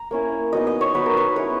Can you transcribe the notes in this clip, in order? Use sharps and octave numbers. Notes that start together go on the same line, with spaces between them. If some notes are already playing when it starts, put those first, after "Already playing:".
Already playing: A#5
A#3 C#4 E4
F#3 B3 D#4 D#5
D#5
C#5
F#3 B3 D#4 B4
A#4
B4
G#3 C#4 E4 B4